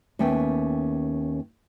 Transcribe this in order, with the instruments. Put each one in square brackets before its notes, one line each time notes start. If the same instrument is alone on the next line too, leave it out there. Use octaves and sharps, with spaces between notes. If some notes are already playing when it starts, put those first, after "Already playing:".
[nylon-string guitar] D#2 A3 B3 C#4 G5